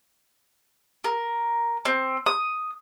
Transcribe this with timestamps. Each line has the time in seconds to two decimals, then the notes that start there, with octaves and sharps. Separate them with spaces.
1.04 A#4
1.85 C4
2.26 D#6